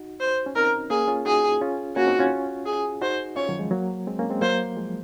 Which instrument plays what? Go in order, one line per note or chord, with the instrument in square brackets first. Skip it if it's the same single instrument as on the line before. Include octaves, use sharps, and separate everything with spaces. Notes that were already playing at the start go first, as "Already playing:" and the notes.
Already playing: [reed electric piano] D#4 F#4
[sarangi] C5
[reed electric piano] C#4
[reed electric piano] C4 D#4 [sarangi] A#4
[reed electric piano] A#3 C#4 [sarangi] G#4
[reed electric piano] C#4 F4
[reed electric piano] D#4 F#4 [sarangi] G#4
[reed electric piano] C#4 F4
[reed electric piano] A#3 C#4 [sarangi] F#4
[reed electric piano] C4 D#4
C#4 F4
[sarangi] G#4
[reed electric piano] D#4 F#4 [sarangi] C5
[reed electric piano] C#4 F4 [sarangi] C#5
[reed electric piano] D#3 F#3
F3 G#3
F#3 A#3
G#3 C4
A#3 C#4
G#3 C4
[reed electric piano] F#3 A#3 [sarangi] C5
[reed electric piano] F3 G#3